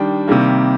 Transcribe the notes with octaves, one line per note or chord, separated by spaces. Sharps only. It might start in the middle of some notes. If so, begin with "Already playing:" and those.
Already playing: D#3 G3 D4 G5
C3 D#3 G3 A#3